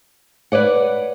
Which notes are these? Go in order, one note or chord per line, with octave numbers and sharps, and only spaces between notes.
B4 C#5 D5 F#5